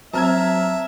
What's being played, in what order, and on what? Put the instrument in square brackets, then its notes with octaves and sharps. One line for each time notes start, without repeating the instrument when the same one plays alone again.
[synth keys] F#3 G#6 [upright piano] C4 [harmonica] E5 [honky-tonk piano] A5 A#5 F6